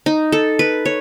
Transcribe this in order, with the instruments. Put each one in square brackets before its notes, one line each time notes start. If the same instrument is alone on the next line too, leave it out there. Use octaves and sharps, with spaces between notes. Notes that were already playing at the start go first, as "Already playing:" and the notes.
[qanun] D#4
A4
B4
C#5